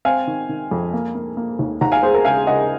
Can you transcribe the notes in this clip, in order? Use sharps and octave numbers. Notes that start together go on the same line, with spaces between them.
C4 F5 G#5
D#3
D#3
F2
A#3
A#3
A#3
D#2
D#2 F#5 A#5
F5 G#5
G#3 G#4 C5
A#4
C#3 F5 G#5
C#3 D#5 F#5